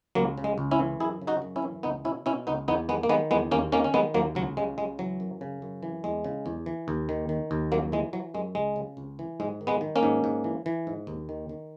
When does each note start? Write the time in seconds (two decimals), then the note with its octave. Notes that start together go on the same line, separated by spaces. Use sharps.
0.15 C#2 F#3 A#3
0.38 C#3
0.44 G#3
0.58 C#2
0.71 C#4 E4
0.79 E3
1.00 F#2 E4 G#4
1.22 C#3
1.27 D#4 F#4
1.42 F#2
1.56 C#4 E4
1.62 E3
1.83 C#2 B3 D#4
2.05 B2 C#4 E4
2.26 B2 C#4 E4
2.47 C#2 B3 D#4
2.68 E2 B3 D#4
2.89 D#3 G#3 B3
3.03 A#3
3.09 D#3 G#3 B3
3.31 E2 G#3 B3
3.51 D#2 A#3 C#4
3.72 D#3 A#3 C#4
3.84 C#4
3.94 D#3 G#3 B3
4.14 D#2 F#3 A#3
4.35 C#2 F#3
4.57 C#3 G#3
4.78 C#2 G#3
4.99 E3 F#3
5.20 F#2
5.41 C#3
5.62 F#2
5.83 E3
6.04 E2 G#3
6.24 C#3
6.46 E2
6.66 E3
6.88 D#2
7.09 D#3
7.29 D#3
7.51 D#2
7.72 F#2 F#3 A#3
7.92 E3 G#3
8.13 E3 F#3
8.34 F#2 G#3
8.55 C#2 G#3
8.76 C#3
8.97 C#2
9.19 E3
9.40 G#2 G#3
9.61 D#3
9.67 G#3 B3
9.81 D#3
9.96 A#3 C#4
10.03 G#2
10.24 G#2
10.44 E3
10.66 E3
10.87 G#2
11.07 D#2
11.29 D#3
11.49 D#3